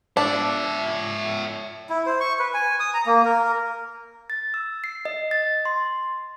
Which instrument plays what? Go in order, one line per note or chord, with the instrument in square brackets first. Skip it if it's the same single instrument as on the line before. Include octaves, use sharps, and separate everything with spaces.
[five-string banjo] D4 [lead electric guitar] C#5 E5
[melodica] E4
C5
C#6
B4
G#5
D#6
A#5
A#3
A#4
[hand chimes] A6
E6
C7
D#5
A6
C6